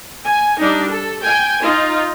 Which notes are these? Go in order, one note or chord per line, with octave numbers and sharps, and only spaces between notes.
G#5
G3 D4 D#4
A4
G5 G#5
D#4 F4